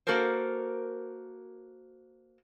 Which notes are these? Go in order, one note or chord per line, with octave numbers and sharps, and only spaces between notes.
A#3 F#4 A4 A#4 C5